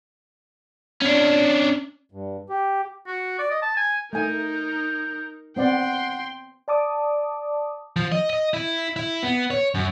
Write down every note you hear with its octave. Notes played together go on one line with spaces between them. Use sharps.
C#4 D4
G2
G4
F#4
D5
D#5
A5
G#5
A3 D#4 A#4 G#5 G6
B3 C4 D5 F#5 G5 C6
D5 A5 D6 D#6
F3
D#5
D#5
E4
E4
B3
C#5
F#2